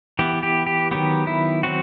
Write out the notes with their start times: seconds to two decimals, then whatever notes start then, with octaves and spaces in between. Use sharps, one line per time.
0.19 E3 B3 G4
0.43 G4
0.67 G4
0.91 D#3 F#3 B3 G4
1.27 E4
1.63 F#3 C4 F#4